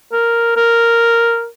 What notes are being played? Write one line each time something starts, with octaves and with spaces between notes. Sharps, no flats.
A#4
A#4